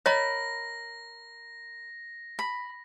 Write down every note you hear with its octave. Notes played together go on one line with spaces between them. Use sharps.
A#4 C#5 D#5 A#5 B5 A#6
B5